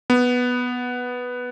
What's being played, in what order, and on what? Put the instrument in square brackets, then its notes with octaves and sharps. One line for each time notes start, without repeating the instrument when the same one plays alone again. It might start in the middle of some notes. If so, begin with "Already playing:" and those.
[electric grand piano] B3